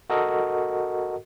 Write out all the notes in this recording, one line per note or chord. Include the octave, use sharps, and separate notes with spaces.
F#4 A4 A#4 D#5